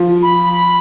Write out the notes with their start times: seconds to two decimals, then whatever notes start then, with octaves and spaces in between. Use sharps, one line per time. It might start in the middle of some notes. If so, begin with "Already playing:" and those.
Already playing: F3
0.22 B5
0.53 B5